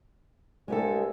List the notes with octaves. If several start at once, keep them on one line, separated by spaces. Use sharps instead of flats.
C2 G2 G#3 G4 A4